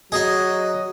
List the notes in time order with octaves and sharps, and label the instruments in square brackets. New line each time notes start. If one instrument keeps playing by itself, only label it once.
[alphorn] F#3 [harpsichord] D#4 G#4 [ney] F#4 [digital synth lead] D#5